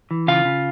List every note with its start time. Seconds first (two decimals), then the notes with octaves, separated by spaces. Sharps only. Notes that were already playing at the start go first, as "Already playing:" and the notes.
0.11 E3
0.27 C#3 F4 F5
0.45 C#3